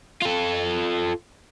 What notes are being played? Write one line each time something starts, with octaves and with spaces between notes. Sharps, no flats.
F4 A4